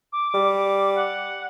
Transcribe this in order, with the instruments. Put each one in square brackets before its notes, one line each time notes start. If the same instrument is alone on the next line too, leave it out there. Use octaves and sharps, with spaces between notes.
[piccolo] D6
[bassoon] G3
[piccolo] F#5